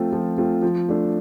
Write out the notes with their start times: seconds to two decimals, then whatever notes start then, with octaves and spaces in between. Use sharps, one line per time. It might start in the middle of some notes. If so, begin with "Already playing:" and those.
Already playing: F3 A3 C4 F4
0.12 F3
0.38 A3 C4 F4
0.62 F3
0.89 A3 D4